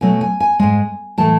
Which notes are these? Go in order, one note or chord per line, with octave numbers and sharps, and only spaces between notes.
B2 F#3 A3 G#5
G#5
G#5
G#2 G#3 G#5
A2 E3 A3 A5